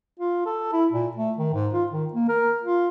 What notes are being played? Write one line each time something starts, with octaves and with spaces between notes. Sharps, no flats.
F4
A4
E4
A#2
A3
D#3
G#2
F4
D#3
A#3
A#4
F4